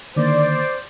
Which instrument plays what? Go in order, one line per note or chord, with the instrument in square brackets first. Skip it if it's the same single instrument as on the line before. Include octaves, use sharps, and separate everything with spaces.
[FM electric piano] D3 D#3 A#3 [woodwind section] C5 [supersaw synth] D5